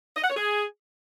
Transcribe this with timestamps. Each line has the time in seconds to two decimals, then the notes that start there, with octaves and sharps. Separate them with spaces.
0.17 D#5
0.23 F#5
0.30 C#5
0.37 G#4